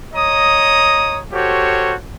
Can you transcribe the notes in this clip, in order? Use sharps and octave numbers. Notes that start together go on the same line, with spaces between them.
C#5 D#5 A#5 D#6
F#4 G4 A4 C5 C#5